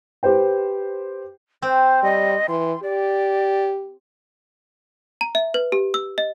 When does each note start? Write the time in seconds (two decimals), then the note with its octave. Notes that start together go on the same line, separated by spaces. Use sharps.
0.23 G4 B4 C5 G5
1.62 C4 C5
2.03 G3 D#5
2.49 E3 C6
2.83 G4 D5
5.21 A#5
5.35 E5
5.54 B4
5.72 G4
5.94 E6
6.18 D#5